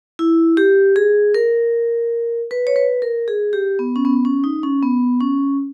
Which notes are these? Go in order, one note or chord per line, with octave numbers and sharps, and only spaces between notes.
E4
G4
G#4
A#4
B4
C#5
B4
A#4
G#4
G4
B3
C#4
B3
C#4
D#4
C#4
B3
C#4